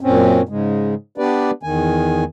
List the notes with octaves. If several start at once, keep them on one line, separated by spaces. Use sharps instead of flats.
F#2 A#2 C4 C#4
G#2 C#3 G#3
B3 D4 G4 B4 D5
E2 D#3 G#5